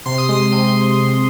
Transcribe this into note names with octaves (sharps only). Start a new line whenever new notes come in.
C3 C6
D#6
G#3 C6
C3 D#6